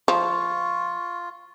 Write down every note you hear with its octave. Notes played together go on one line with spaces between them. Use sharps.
F3 F4 C#6